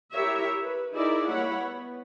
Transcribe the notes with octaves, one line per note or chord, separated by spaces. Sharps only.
E4 G4 A#4 C#5 E5
B4
D#4 E4 G#4 A#4 D5 E5
G3 A#3 E4 C#5 F#5 B5
B3